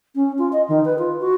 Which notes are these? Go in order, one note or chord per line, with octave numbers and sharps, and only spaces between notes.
C#4
F4
D#5
D#3
B4
F4
F#4